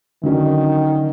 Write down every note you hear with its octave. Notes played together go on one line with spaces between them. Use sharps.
D3 D#3 F#3 C#4